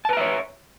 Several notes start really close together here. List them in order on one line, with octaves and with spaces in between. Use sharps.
A5 B4 A#5 E5 C#5